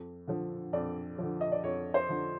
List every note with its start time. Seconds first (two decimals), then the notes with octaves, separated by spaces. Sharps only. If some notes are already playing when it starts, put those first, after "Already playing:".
Already playing: F2
0.27 D3 F3
0.73 F2 D5
1.18 D3 F3
1.41 D#5
1.52 D5
1.63 F2 C#5
1.94 C5
2.09 D3 F3